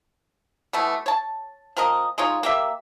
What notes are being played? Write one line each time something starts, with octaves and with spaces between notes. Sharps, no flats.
B2 E3 A3
C#5 A5
F3 C4 A#4 D#5
G#3 D#4 F4 C#5
A#3 G4 E5